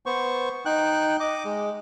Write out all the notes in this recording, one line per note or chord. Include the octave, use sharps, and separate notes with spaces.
B3 C5 C#6
D#4 G5 F#6
D#5 D6
G#3